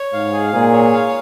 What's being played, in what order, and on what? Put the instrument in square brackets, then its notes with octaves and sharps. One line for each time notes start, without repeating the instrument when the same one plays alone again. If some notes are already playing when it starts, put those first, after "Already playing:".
Already playing: [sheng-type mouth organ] C#5
[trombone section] G#2 [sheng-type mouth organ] F5
[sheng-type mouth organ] G#4
[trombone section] A#2 [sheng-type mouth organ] G#4
[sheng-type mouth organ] C#5
F5